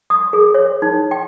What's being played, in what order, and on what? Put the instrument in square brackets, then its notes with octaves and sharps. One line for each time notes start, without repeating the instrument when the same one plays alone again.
[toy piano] D#6
G#4
C#5
D#4
G5